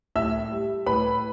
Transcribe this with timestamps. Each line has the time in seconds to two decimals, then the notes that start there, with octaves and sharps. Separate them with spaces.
0.15 A2 E5 E6
0.51 G3
0.86 A2 B4 B5